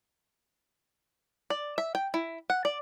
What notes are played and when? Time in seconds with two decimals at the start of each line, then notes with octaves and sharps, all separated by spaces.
1.50 D5
1.78 E5
1.95 G5
2.14 E4
2.50 F#5
2.65 D5